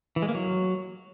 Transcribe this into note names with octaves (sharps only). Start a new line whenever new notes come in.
E3
G#3
A#3
F#3